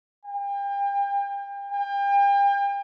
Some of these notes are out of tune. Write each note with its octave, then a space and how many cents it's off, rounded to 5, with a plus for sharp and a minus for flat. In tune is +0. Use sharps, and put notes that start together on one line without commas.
G5 +35
G5 +35